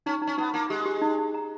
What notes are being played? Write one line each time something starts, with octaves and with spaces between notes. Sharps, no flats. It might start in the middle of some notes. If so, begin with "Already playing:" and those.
C#4 D#4
D#4
C#4
B3 D#4
A#3 D#4
G#3 G4
G4
D#4
D#4
A#5